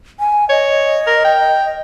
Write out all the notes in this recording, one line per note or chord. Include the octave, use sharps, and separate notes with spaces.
G#5
C#5 D#5
A#4
G5